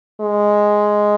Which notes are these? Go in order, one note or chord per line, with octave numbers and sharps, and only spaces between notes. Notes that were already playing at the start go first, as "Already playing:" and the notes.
G#3